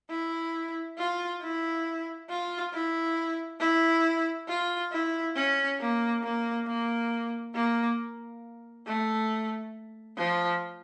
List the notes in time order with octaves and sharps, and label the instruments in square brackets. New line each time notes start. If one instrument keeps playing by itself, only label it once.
[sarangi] E4
F4
E4
F4
E4
E4
F4
E4
C#4
A#3
A#3
A#3
A#3
A3
F3